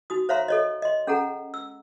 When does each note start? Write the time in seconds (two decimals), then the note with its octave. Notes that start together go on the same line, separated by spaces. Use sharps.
0.10 D#4 F#4 D#6
0.29 C5 C#5 E5 F5 A#5 C6
0.48 A4 C#5 D#5
0.82 D#5 C6
1.07 C#4 G#4 A4 F#5 A#5
1.54 E6